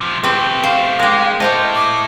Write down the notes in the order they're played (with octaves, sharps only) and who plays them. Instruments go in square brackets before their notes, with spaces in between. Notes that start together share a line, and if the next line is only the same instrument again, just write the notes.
[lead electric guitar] C3 F3
[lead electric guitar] A3 G4 [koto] C4 B4
[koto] C5 [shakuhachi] F5
[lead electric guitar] G#3 [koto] G4 A#4
[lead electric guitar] E4 A4 [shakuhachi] C5 [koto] D#5 F5 G5
[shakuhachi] D6